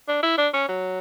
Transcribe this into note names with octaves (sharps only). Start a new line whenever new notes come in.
D4
E4
D4
C#4
F#3